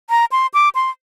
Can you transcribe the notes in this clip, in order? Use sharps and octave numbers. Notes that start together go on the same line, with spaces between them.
A#5
C6
D6
C6